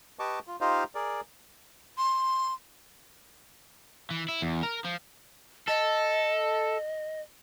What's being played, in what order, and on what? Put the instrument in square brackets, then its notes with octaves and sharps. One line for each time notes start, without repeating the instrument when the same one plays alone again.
[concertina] G4 B4 D#5 A5 C#6 D6
F4
D#4 F4 G4 C5 D#5 F5
G#4 A#4 D5
[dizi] C6
[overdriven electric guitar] E3
E4
E2
A#4
F3
[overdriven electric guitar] A4 [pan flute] D#5